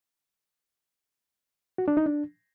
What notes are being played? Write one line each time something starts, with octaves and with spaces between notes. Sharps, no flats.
F#4
D4
D#4
D4